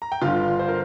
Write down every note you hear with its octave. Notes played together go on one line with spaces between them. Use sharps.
A#5
G5
G1 G2 D3 F4 F5
C5
A#4